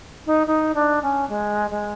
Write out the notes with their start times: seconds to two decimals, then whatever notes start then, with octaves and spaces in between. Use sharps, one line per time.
0.26 D#4
0.47 D#4
0.74 D4
1.02 C#4
1.29 G#3
1.71 G#3